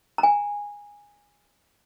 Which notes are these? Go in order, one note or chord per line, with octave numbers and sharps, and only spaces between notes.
A#5
G#5